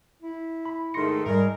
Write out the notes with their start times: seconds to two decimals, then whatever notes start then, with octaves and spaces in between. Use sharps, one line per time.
0.22 E4
0.65 B5
0.94 G#2 D#3 A3 C6 A#6 C#7
1.26 G#2 G3 G#3 A#4